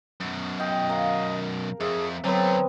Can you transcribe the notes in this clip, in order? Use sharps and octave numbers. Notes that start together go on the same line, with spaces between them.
F#2 B2
D#5 G5
A#4 F5
F2 G#4 E5
D3 F#3 A3 B3 C4